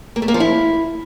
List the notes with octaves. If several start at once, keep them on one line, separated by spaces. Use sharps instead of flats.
A#3
A3
A#3
F3
E4